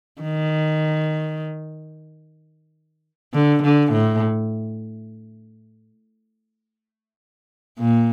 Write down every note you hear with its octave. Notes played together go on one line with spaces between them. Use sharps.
D#3
D3
D3
A2
A#2